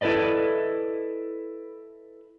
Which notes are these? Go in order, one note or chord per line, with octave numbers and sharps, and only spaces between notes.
E4 A4 B4 D5 D#5